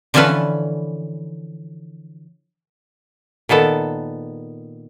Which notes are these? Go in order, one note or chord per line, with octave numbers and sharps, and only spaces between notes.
D3 E3 F3 C#4 A4 B4
A#2 D#3 B3 A4